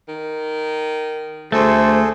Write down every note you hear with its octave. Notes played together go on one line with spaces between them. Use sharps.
D#3
D2 A3 G#4 A4 C5